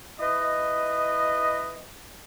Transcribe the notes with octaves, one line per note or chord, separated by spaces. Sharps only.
E4 B4 D#5